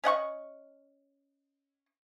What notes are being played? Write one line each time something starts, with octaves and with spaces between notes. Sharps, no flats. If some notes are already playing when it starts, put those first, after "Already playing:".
C#4 D#5 F#5 C#6